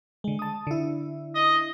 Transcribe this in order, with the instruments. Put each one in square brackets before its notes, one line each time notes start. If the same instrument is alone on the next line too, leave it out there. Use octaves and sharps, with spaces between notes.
[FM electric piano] D3 G#3
A5 D#6
D3 E4
[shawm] D#5